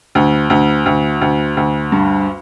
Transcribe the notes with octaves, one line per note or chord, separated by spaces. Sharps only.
D2
D2
D2
D2
D2
G2